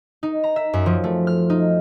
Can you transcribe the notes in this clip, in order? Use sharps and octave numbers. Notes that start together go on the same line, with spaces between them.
D#4
A#5
E5
F#2
F3
A3
F6
D#4